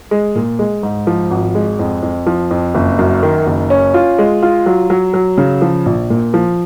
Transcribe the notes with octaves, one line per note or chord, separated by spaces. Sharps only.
G#3
A#2
G#3
G#2
F3
G#1
G#3
F2
F2
F3
F2
F#1
F#2
D#3
F#1
C#4
F4
G#3
F4
F#3
F#3
F#3
C#3
F3
A#1
A#2
F3